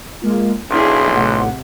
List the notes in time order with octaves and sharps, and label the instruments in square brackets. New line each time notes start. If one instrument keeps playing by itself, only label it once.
[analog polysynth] G#3 A#3 F4
[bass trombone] B1 [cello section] D4 E4 G#4 [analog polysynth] F5 [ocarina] C6
[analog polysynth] A1 A2 F#5 [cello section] C3